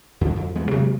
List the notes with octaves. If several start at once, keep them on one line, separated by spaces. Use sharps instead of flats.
F2 D3 F3 F#3
F2
E2 G#3 B3
C3 F#3 G#3 A#3